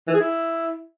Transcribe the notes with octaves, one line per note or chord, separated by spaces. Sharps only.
E3
G#4
E4